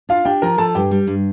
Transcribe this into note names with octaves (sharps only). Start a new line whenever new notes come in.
D4 F4 F5
D4 G4 G5
F3 A#4 A#5
F3 A4 A5
G2 G4 G5
G3
G2